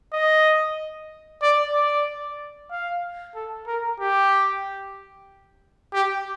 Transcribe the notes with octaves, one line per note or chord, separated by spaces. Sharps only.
D#5
D5
D5
F5
A4
A#4
G4
G4